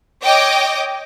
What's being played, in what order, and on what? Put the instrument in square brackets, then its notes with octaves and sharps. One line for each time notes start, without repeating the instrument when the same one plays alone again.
[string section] C#5 D#5 G5 D6